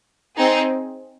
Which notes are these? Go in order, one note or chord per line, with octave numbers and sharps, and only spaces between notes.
C4 D#4 G#4